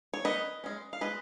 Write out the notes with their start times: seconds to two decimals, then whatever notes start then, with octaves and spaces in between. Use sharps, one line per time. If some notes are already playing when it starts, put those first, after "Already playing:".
0.14 C#5
0.25 D#3 B4 D#5
0.64 G#3 C#4
0.93 F5
1.01 G#3 B4 D#5